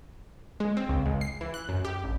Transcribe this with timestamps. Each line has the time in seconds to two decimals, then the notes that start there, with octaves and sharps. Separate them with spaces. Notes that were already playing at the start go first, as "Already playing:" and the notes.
0.60 G#3
0.77 C4
0.89 C#2
1.06 C#2
1.21 C7
1.41 E3
1.54 F#6
1.69 F#2
1.85 G4
2.04 A1